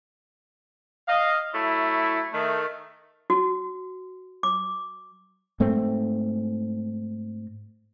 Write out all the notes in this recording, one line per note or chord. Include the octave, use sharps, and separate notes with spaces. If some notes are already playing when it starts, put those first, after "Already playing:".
D#5 F5
F#3 A3 E4
D#3 A3
F#4
D6
G#2 A3 C4